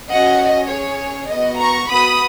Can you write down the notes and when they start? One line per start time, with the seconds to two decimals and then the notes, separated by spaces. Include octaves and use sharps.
0.12 C#4 F#4 D#5 F#5
0.41 D#5
0.71 C#4 G#4 C#5
1.31 B3 F#4 D#5
1.60 A#5 C#6
1.90 B3 F#4 B5 D#6